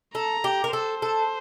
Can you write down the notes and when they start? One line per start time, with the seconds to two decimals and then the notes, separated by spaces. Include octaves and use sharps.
0.15 A4 A#5
0.44 G4
0.64 A#4
0.73 A4 C5
1.02 A4